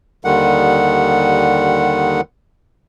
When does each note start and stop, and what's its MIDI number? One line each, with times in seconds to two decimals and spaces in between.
0.25 2.21 39
0.25 2.21 50
0.25 2.21 51
0.25 2.21 55
0.25 2.21 78